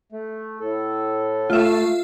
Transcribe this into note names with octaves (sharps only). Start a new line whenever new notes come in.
A3
A2 A4
A3 F4 E5